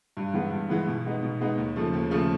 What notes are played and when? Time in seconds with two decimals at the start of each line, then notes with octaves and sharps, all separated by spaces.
0.17 G2
0.34 E3 G#3 B3
0.52 G2
0.69 E3 G#3 B3
0.87 B2
1.05 G#3 B3 D#4
1.23 B2
1.41 G#3 B3 D#4
1.58 D#2
1.76 C#3 F3 A3
1.94 D#2
2.11 C#3 F3 A3